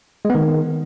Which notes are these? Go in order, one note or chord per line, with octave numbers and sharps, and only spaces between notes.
G#3
B3
D#3